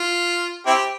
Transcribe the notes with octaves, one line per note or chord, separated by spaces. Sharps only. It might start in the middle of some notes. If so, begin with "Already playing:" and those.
Already playing: F4
C4 E4 G4